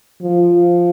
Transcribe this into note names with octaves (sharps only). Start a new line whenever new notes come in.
F3